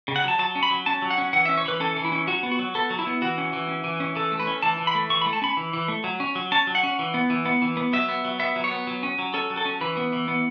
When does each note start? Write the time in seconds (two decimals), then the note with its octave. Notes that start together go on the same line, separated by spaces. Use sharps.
0.08 C#3
0.16 F#5
0.24 F#3 A5
0.39 F#3 A5
0.55 C#4
0.63 B5
0.71 F#3
0.86 C#4 A5
1.02 F#3
1.10 F#5
1.18 C#4
1.33 E3 F#5
1.45 E5
1.49 C#4
1.58 C#5
1.65 E3 B4
1.80 C#4 A4
1.97 E3
2.05 E4
2.12 C#4
2.27 F#3 F#4
2.43 B3
2.51 F#4
2.59 F#3
2.75 B3 A4
2.90 F#3
2.99 E4
3.07 B3
3.22 E3 F#4
3.38 C#4
3.53 E3
3.69 C#4
3.84 E3
4.00 C#4
4.16 E3 A4
4.32 A3
4.40 B4
4.47 C#4
4.63 E3 A5
4.78 E3
4.87 B5
4.95 A3
5.10 E3 C#6
5.21 A3 B5
5.33 A5
5.42 C#4 B5
5.57 E3
5.74 E3
5.88 A3
6.04 F#3
6.20 C#4
6.35 F#3
6.52 C#4 A5
6.67 F#3
6.75 F#5
6.83 C#4
6.99 E3
7.14 B3
7.30 E3
7.46 B3
7.62 E3
7.77 B3
7.93 F#3 E5
8.09 B3
8.25 F#3
8.40 B3 E5
8.56 F#3
8.64 C#5
8.71 B3
8.87 F#3
9.03 C#4
9.19 F#3
9.34 C#4 A4
9.50 F#3
9.57 A4
9.65 C#4
9.81 E3 B4
9.97 B3
10.13 E3
10.28 B3